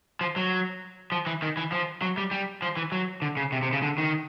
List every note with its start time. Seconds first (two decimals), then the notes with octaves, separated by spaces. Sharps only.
0.21 F3
0.36 F#3
1.12 F3
1.27 E3
1.42 D#3
1.57 E3
1.72 F3
2.02 F#3
2.17 G3
2.31 G3
2.62 F3
2.77 E3
2.92 F#3
3.22 D3
3.37 C#3
3.52 C3
3.62 C3
3.73 C#3
3.82 D3
3.98 D#3